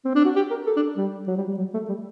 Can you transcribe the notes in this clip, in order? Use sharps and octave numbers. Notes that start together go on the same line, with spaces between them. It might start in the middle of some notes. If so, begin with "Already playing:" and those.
C4
D4
F#4
G4
A#4
A4
D4
G3
F#3
G3
G3
F#3
A3
G3